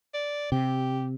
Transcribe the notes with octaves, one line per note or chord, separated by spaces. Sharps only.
D5
C3 G4